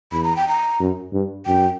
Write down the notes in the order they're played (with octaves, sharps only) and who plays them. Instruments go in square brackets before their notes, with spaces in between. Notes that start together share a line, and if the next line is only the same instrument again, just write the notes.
[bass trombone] E2 [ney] B5
[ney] A#5
G5
A#5
[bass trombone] F#2
G2
[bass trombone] F#2 [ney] G5